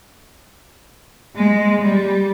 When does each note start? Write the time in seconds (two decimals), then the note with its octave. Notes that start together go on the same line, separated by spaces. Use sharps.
1.36 G#3
1.81 G3